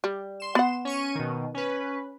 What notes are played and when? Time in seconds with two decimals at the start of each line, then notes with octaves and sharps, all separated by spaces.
0.04 G3
0.40 C6 E7
0.55 B3 F#5
0.85 C#4 C#6 D#7
1.15 B2 D#3
1.54 C#4 B4